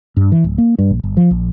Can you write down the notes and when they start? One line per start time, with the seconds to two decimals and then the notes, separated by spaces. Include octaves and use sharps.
0.17 G2
0.32 E3
0.44 D1
0.58 A#3
0.78 G2
0.91 A#1
1.03 G1
1.17 F3
1.31 A#1